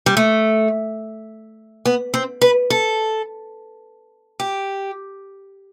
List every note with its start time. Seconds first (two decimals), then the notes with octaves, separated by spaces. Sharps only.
0.06 G3
0.17 A3
1.85 B3
2.14 C4
2.41 B4
2.70 A4
4.40 G4